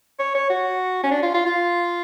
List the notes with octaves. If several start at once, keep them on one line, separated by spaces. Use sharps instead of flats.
C#5
C#5
F#4
C#4
D4
F4
F4
F4